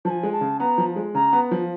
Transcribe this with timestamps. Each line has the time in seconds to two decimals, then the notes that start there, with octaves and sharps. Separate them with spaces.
0.05 F3 A5
0.09 G#5
0.23 G#3
0.32 A5
0.41 C#3
0.60 B3 A#5
0.78 F3
0.96 G#3
1.15 C#3 A#5
1.33 B3
1.51 F3